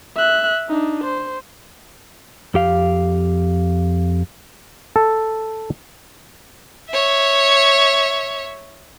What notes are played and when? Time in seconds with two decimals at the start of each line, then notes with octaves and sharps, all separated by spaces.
0.16 E5 F#6
0.68 D4 D#4
1.04 C5
2.54 F2 G4 F5
4.96 A4
6.90 C#5 E5